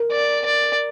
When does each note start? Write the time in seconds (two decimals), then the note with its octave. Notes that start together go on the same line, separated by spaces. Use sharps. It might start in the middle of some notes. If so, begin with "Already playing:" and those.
Already playing: A#4
0.12 D5
0.46 D5